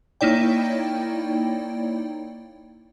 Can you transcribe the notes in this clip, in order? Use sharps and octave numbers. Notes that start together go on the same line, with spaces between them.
A#3 D#4 E4 C#5 D5 G5